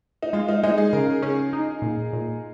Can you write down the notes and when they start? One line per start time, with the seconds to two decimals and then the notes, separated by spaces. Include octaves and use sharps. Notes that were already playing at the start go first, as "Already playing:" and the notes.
0.23 D#4
0.33 G#3 F4
0.49 D#4
0.63 G#3 D#4
0.78 G#4
0.93 C#3 A#4
1.22 C#4 G#4
1.53 D#4
1.82 A#2
2.13 A#2